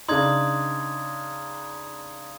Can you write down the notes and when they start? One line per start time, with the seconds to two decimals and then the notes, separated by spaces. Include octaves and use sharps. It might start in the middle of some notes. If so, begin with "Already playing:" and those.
0.08 C#3 D4 D#4 C6 D#6 G#6